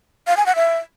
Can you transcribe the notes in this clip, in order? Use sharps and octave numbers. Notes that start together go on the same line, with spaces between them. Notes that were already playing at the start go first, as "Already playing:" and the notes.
F5
G#5
F#5
E5